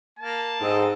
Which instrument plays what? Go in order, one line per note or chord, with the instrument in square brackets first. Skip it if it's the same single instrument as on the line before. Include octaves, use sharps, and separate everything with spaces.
[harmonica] A#3 [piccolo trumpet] A5
[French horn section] G#2 [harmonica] C4 A4 D#5